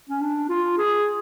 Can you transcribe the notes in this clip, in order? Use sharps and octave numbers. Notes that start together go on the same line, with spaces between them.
C#4
D4
F4
G#4